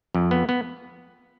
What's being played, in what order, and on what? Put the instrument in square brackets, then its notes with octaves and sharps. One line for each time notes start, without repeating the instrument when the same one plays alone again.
[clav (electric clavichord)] F2
B3
B3